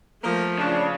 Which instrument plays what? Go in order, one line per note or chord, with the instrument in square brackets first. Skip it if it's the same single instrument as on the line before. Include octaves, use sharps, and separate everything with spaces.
[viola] F3 A3 [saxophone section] A#3 A#4
[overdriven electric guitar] C#3 [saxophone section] D4